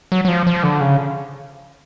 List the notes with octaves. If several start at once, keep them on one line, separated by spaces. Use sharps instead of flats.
F#3
F#3
F3
F3
D3
C#3